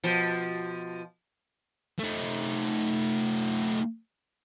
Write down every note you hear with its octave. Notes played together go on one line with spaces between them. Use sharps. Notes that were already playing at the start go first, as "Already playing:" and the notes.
B2 F3
A3 D#4